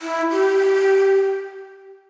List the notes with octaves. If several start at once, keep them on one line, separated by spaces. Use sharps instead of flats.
E4
G4